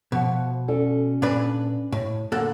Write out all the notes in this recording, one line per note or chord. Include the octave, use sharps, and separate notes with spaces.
B2 F3 F#5
C#4 A4 D5
A#2 D4 B4
A2
A#2 D3 A#3 A4 F#5